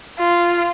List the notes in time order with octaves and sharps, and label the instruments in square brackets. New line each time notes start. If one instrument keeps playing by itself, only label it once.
[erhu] F4